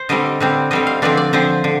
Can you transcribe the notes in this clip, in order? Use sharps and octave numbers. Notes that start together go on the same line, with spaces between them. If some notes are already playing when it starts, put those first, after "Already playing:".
Already playing: C5
D3 G3 C4 D#5
D3 G3 C4
D3 G3 C4 D#5
F5
D3 F3 C4 D5
D5
D3 F3 C4 C5
D3